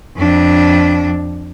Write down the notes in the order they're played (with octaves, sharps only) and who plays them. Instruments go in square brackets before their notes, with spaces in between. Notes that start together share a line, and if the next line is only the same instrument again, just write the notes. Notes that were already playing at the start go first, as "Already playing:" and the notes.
[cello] F2 D4